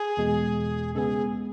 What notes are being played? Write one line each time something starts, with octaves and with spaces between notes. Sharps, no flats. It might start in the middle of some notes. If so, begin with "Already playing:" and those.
Already playing: G#4
E2 B2 G#3
C#3 G#3 B3 G#4 A4